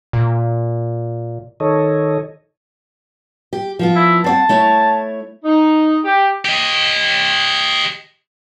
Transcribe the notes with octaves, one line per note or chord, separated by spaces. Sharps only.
A#2
D#3 A4 C#5 D#5
G4
F3 B3 F4
E4
C4 C#5 F#5 A5
A3 E4 C#5
D#4
G4
G4 D#5